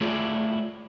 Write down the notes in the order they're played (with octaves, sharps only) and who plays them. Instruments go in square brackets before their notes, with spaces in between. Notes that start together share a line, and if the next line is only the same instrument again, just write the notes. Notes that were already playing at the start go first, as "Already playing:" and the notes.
[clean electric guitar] A3 E4 F4 G#4 C#5 D5